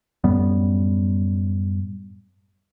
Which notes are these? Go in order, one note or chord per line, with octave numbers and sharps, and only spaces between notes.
F#2 A2 G3 B3